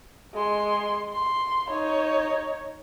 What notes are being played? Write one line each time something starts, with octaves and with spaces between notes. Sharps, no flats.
G#3 C6
C6
D#4 C#5